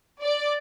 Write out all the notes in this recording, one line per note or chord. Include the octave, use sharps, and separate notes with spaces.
D5